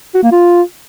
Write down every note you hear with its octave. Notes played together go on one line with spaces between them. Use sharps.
F#4
A#3
F4